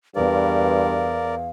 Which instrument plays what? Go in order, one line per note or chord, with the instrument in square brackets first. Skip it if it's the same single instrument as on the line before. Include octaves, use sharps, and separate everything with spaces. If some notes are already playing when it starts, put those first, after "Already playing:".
[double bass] E2 [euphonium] G2 [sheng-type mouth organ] A#4 D5 [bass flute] F5